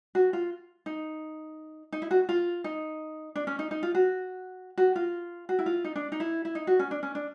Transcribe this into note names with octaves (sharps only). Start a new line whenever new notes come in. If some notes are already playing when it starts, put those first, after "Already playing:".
F#4
F4
D#4
D#4
E4
F#4
F4
D#4
D4
C#4
D#4
D#4
F4
F#4
F#4
F4
F#4
E4
F4
D#4
D4
D#4
E4
E4
D#4
F#4
C#4
D4
C#4
D4